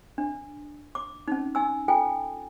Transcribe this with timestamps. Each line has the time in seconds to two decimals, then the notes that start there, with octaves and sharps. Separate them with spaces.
0.18 D4
0.95 D6
1.28 C#4 D#4
1.55 D#4 G#5 E6
1.88 F4 A4 G5 G#5